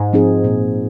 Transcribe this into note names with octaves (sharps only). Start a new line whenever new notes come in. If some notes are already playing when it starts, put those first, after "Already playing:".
Already playing: G#2
F3 C4 D#4 G#4
A#2